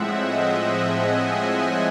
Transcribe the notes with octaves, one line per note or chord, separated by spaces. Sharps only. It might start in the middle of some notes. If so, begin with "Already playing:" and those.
Already playing: A2 F3 G#3 C4 E5 F#5
D#5
E5
G#5